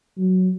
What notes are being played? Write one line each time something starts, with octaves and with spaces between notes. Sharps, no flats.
F#3